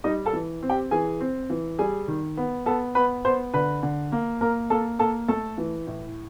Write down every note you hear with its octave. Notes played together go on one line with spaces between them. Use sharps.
G3 D#4 D#5
A4 A5
E3
C4
G4 G5
E3 G#4 G#5
C4
E3
G3 G#4 G#5
D#3
B3
B3 A4 A5
B3 B4 B5
B3 C5 C6
D3 B4 B5
D3
A#3
A#3 A#4 A#5
A#3 A4 A5
A#3 A4 A5
A3 A4 A5
E3
A2